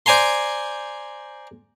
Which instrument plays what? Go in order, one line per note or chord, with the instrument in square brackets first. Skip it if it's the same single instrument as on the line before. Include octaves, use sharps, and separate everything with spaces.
[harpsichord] C5 D5 G#5 A#5 C6